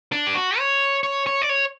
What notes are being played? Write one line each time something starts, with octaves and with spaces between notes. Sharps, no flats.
D4
G4
F#4
C#5
C#5
C#5
D5
C#5